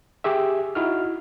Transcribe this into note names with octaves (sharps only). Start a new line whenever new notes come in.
G4 G#4 E5
D#4 E4 F#4 F6